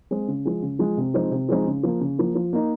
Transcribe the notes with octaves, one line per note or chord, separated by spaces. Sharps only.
G#3 C4
C#3
F3 G#3
C#3
F3 G#3
C3
F3 G#3 C4 D#4
C3
F3 G#3 C4 D#4
C#3
F3 A#3
C#3
F3 A#3
F3
A#3 D#4